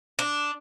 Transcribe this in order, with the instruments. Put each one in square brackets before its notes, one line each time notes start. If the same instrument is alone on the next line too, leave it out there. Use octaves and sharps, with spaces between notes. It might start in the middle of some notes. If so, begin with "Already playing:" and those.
[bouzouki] D4